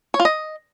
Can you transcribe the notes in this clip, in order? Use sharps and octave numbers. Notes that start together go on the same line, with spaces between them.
C#5
F4
D#5